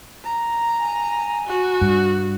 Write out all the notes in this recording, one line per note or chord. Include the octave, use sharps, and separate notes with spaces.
A#5
G#5
F#4
G2